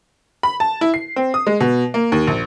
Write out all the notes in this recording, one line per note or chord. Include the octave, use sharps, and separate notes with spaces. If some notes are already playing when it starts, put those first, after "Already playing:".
B5
A5
E4
C7
C4
D#6
G#3
B2
A#3
D#2
A#1